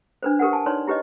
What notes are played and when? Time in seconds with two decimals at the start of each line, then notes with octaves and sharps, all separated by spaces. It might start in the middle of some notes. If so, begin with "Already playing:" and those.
0.23 D4 B4 C5
0.39 G4 A#4 B4 F#5
0.53 G#5 A5
0.66 D#4 B4 C#5 D5 C6
0.87 E4 G4 B4 C#5 D#5